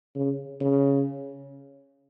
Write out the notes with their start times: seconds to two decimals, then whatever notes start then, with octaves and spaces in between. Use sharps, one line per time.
0.15 C#3
0.61 C#3